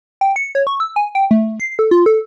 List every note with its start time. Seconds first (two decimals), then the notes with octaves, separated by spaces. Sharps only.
0.21 G5
0.36 C#7
0.55 C#5
0.67 C#6
0.80 E6
0.96 G#5
1.15 G5
1.31 A3
1.60 C7
1.79 A4
1.91 F4
2.06 A4